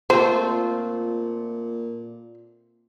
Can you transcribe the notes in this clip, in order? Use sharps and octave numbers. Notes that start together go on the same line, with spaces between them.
A#2 A3 C4 F4 C5